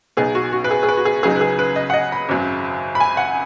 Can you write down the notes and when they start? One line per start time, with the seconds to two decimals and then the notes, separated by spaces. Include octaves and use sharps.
0.17 B1 B2 B3 D#4 G#4
0.35 F#4
0.53 F#4
0.64 B4
0.71 G#4
0.83 G#4
0.89 B4
0.97 F#4
1.05 G#4
1.23 C#2 C#3 F#3 D#4 G#4
1.36 B4
1.41 G#4
1.59 B4
1.76 D#5
1.90 F#5
1.94 D#5
2.12 B5
2.29 G#1 F#2 F#3
2.95 B5
3.00 G#5
3.17 F#5